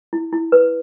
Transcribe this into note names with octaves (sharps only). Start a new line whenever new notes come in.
E4
E4
B4